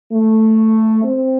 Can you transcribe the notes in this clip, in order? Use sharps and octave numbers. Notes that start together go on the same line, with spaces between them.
A3
C4